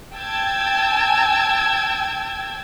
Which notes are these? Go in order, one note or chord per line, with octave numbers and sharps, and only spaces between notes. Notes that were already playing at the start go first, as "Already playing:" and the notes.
G5 A5 E6 G#6